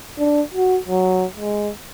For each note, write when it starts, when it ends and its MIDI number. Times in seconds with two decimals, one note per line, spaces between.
0.19 0.41 62
0.54 0.78 66
0.88 1.25 54
1.36 1.70 56